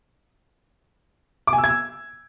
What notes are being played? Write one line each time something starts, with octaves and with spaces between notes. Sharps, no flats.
D6
G#5
E6
G#6
E6